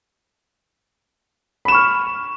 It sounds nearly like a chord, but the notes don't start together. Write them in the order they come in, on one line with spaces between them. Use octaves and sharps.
B5 E7 C#6 F6